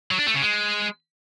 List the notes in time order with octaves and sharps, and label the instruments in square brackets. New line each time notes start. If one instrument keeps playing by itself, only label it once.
[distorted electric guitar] F#3
D4
A3
C#3
G#3